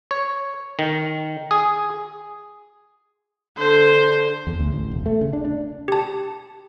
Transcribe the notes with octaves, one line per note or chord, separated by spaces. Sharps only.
C#5
D#3
G#4
D3 C5
E2
D2
A1
E1
A3
C#3
D4
D4
G4 A5